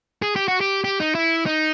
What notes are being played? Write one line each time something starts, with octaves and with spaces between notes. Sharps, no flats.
G#4
G4
F#4
G4
G4
D#4
E4
D#4